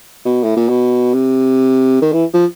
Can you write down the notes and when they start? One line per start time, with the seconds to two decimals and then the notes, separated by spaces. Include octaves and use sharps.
0.25 B2
0.43 A2
0.56 A#2
0.69 B2
1.13 C3
2.01 D#3
2.12 E3
2.34 F3